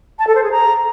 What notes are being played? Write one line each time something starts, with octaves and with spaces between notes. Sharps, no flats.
A5
A4
C5
G#4
A#5